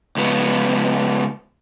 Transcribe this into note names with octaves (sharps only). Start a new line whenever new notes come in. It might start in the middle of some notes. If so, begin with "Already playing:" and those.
C#2 B3